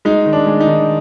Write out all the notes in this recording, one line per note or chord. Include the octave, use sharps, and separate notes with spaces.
G#3 D#4
D#3
D4
G#3
D#4
D#3